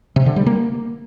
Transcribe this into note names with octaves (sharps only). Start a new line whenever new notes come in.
C3
D3
G3
A#3